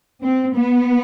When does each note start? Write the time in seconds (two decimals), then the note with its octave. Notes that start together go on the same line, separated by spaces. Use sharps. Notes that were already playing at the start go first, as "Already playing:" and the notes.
0.22 C4
0.54 B3